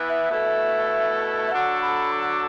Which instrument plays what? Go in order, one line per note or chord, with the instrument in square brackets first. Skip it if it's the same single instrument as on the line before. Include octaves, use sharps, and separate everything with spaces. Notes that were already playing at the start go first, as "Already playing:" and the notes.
Already playing: [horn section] E3 B3 E4
[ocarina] E5
[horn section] B2 A3 E4 A4
[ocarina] E5
[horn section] D3 F#3 D4 F#4 A4 [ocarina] F#5
[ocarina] B5
D6